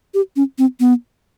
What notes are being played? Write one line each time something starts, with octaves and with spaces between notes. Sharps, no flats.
G4
C#4
C4
B3